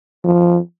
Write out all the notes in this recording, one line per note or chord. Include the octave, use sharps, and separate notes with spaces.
F3